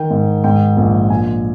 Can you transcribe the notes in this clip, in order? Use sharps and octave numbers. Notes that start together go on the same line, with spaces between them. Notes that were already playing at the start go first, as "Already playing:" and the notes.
Already playing: D#3 G5
G#2
G#2 G5
A#1
A#1 G#5